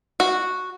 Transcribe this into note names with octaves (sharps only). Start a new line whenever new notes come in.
F#4